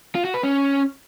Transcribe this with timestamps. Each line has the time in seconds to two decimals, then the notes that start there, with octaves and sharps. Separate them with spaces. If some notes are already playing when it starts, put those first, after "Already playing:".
0.15 F4
0.25 F#4
0.34 B4
0.43 C#4